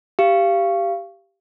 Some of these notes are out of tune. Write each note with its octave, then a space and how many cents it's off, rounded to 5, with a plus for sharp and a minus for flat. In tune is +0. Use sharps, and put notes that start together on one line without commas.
G4 +0 F5 -25